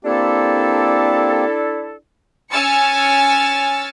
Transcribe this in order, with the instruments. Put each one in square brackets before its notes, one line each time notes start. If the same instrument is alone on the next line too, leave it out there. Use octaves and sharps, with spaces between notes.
[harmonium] A#3 C4 G4 [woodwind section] D4 E4 A4
[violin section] C#4 G#5 E6 F6 A6 C#7